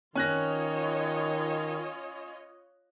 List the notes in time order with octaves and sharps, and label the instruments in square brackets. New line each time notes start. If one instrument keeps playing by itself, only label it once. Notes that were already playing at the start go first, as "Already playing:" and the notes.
[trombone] D#3 [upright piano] C#4 F#6 A#6 [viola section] F4 C#5 D#5